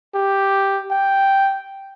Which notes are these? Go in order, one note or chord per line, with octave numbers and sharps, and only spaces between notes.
G4
G5